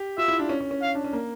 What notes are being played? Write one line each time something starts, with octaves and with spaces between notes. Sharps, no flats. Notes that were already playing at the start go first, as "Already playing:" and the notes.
Already playing: G4
F4 E5
E4
D4
C#4
C#4
C#4
F5
D4
C#4
A#3